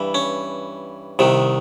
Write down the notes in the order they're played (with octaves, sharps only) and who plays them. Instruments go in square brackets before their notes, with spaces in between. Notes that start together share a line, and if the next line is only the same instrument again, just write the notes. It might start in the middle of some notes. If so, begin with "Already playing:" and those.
Already playing: [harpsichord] G2 E3
C#4
C2 C3 D#3